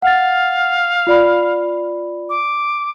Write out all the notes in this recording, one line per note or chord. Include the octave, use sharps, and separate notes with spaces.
F5 F#5 A6
F4 D5 B5
D6